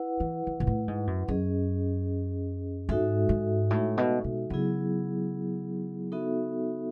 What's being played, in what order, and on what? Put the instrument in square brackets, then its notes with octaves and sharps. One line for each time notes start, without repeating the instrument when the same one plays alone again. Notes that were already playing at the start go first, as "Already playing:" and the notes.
Already playing: [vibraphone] E4 B4 F#5
[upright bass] E3
E3
B2
A2
G#2
F#2
[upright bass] F#2 [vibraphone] C#4 G#4 D#5
[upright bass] G#2 [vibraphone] G#3 D#4 F#4 A4 E5
[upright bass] G#2
A2
B2
B2
[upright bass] C#3 [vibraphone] F#3 B3 E4 G#4
[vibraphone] B3 D#4 F#4 A4 E5